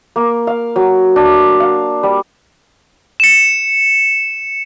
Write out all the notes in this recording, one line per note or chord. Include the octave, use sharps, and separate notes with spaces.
A#3
F5
F#3
D4
F5
G3
C#7 E7